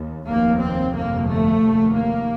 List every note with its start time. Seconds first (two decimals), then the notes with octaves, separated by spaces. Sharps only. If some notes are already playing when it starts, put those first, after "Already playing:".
Already playing: D#2
0.27 F1 D#2 A#3
0.61 C4
0.94 G1 F2 C3 A#3
1.28 A3
1.62 F1 D#2
1.95 A#3